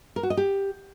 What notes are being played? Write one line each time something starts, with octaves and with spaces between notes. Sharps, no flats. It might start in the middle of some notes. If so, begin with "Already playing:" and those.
A#4
F#4
D#5
G4